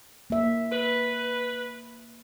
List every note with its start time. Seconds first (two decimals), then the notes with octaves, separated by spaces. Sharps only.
0.30 A#3 E5
0.72 B4